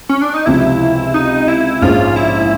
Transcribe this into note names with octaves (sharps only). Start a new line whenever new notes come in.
C#4
D4
D#4
C#2 C3 F3 E4
D#4
E4
A#1 G#2 F3 G#3 C#4 F4
E4